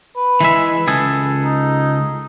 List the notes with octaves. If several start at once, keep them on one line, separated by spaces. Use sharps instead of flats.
B4
E3 G#3 E5
C#2 G#4 A4
D#4